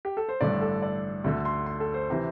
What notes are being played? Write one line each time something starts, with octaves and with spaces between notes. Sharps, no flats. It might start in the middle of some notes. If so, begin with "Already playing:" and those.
G4
A4
C5
A1 G2 D3 D5
A4
D5
D2 D3
C6
C6
A4
C5
C3 E3